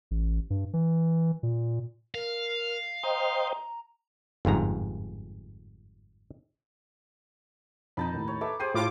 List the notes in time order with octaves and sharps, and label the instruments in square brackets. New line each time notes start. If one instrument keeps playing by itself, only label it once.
[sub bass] A1
G2
E3
A#2
[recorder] A#4 [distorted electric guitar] F5
[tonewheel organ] C5 D#5 G5 [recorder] A#5
[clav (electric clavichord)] G1 F2 G#2 A#5
[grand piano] F2 [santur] D#4 A5 B5
[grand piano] D#2 A2
[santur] C#5
[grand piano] A4 B4 E5 [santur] D6
[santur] G4 G#4 C5 [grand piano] G5 C7 D#7
[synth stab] A2 F4 D6